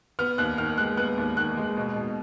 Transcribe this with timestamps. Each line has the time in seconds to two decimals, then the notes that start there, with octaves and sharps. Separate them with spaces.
0.19 B3 F6
0.38 D#2 F#6
0.58 D#3 F6
0.78 G#3 F#6
0.97 B3 F#6
1.18 D#2
1.37 D#3 F#6
1.57 G#3
1.77 B2
1.96 B2